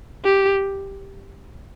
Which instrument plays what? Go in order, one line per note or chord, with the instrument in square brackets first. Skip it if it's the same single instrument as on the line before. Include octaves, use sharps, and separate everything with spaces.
[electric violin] G4